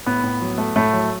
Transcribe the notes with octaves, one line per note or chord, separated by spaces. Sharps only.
A2 B3
A2
F#3
A3
A2 A3
F#3